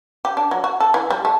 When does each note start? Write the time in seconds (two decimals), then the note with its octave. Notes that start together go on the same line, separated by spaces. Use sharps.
0.25 G4
0.37 D4
0.51 F#3
0.64 F#4
0.80 A4
0.94 E3
1.10 G3
1.25 A3